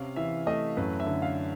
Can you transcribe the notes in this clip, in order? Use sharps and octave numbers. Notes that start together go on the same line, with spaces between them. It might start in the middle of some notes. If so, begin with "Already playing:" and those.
Already playing: C3 C#4 F5
E3 E5
A3 D#5
F#2 B4
E5
D3
F5